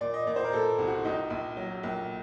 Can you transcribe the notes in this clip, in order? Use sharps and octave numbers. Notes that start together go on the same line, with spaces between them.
A#2 D5
D#5
A#2 D5
C5
A#4
A#2 A4
C2
F#4
A#1 D#4
A#1
F#3
A#1